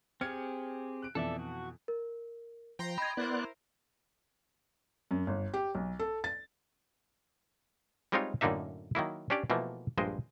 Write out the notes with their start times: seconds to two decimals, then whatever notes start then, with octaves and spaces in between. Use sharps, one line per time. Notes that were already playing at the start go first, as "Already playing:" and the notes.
0.21 C4 G4 G#4 F6 G#6 C#7
1.02 F#6 D7
1.15 F2 B2 E3 A4 D5 E5
1.39 F#4
1.88 A#4
2.79 F3 G5 A#5 C6
2.98 D#5 B5 G#6
3.17 B3 E4 A#4 C5 D5 F#6
5.11 F#2
5.27 G1
5.54 G4
5.75 B1
5.99 A4
6.24 A6
8.12 G3 G#3 C4 D#4 F4 C#5
8.41 F#2 A2 D3 A#3 D#4 E5
8.95 D#3 F#3 A#3 E4
9.30 C#4 D4 G4 C#5 D5
9.50 B2 E3 F3 A3 A#3
9.98 A#1 G2 G#3 C5 D#5